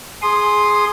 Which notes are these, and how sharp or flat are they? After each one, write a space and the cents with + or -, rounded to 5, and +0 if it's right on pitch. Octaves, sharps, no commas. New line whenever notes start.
G#4 +5 C6 +0 D#6 -20